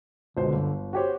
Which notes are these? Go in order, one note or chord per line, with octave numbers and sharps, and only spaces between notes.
C#2 B2 D3 C5
G1
F#4 G4 C5 C#5